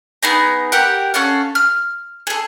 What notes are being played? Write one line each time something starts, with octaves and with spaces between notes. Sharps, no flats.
B3 D#4 G#4 A#5
G4 A#4 F#5
C#4 A4 F5 F#5
F6
G#4 A4